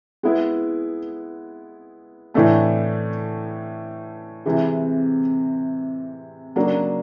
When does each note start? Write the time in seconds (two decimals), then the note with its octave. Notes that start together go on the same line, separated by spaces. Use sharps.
0.23 G#3 B3 E4 G#4
2.34 A2 E3 A3 D4
4.46 C3 E3 G#3
6.56 C#3 F#3 A#3 D4